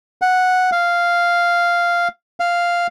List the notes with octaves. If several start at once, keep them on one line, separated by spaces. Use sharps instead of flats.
F#5
F5
F5